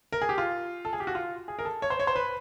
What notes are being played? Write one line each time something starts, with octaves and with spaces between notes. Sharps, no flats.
A#4
G#4
G4
F4
A4
G#4
G4
F#4
F4
G#4
A#4
A4
C#5
C5
C#5
C5
B4